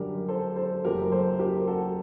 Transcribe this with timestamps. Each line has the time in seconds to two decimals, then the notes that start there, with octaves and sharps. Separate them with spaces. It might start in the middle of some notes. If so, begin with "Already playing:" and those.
Already playing: F#2 D3 G3 G4 A#4
0.28 A4 C5
0.56 A4 C5
0.84 F#1 F#2 F#3 G4 A#4
1.11 A4 C5
1.39 G4 A#4
1.67 F#4 A4